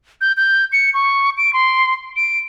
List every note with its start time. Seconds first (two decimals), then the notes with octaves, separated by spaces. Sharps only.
0.21 G6
0.37 G6
0.72 C#7
0.94 C#6
1.37 D7
1.53 C6
2.16 D7